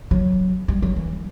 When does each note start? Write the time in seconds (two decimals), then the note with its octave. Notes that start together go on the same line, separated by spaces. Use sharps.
0.11 F#3
0.68 G3
0.82 F#3
0.96 E3